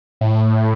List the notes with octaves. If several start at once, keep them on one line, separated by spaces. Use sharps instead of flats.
A2